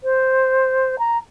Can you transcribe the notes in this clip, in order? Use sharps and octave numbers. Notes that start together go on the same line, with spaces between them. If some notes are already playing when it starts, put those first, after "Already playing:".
C5
A#5